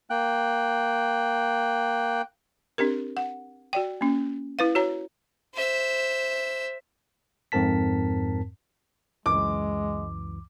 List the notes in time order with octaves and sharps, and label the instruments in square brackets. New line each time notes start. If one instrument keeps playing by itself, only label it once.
[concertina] A#3 G5 F#6
[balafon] C4 D4 G4 A#4
F#5
F#4 D5 G5
A#3 C#4
E4 B4 F5
F#4 C#5 A#5
[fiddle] C5 E5
[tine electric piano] F2 G#2 C4 A#4 A5 B6
[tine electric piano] C#2 F#2 E3 [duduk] G#3 [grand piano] D6